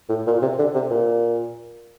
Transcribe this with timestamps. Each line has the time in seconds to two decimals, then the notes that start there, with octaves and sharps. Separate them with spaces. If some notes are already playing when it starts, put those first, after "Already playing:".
0.09 A2
0.27 A#2
0.42 C3
0.59 D3
0.74 C3
0.91 A#2